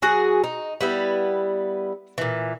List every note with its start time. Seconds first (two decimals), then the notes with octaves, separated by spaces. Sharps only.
0.02 F#3 F#4 G#4
0.44 D#4
0.81 G3 B3 E4
2.18 A#2 E3